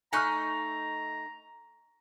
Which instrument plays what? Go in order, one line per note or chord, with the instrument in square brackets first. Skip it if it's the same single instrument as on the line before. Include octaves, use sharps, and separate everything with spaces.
[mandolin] A3 D#4 F#6 [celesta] G#5 C#6 F6 [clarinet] A#5